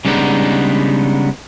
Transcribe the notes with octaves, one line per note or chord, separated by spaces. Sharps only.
C#3 G3 G#3 B3 D4 D#4